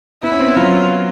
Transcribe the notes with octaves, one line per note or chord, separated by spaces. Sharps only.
B3 E4
C#4
C4
B3
F#3 F4